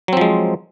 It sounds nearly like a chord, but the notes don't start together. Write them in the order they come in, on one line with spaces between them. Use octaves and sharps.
F#3 C4 F3 G#3